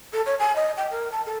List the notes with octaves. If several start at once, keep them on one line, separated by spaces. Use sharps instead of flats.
A4
C#5
G#5
D#5
G5
A#4
A5
A4